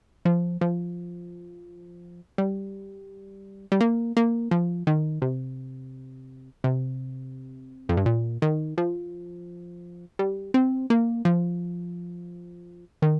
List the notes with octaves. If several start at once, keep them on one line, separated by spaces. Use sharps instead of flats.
F3
F3
G3
G3
A#3
A#3
F3
D#3
C3
C3
F2
G2
A#2
D#3
F3
G3
C4
A#3
F3
D#3